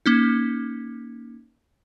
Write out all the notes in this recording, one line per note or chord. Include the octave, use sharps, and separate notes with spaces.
A#3 C#4 D#4